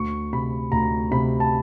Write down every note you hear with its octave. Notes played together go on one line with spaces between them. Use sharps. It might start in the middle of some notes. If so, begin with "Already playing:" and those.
Already playing: D2 C#6
C3 B5
D2 A#5
C3 B5
A5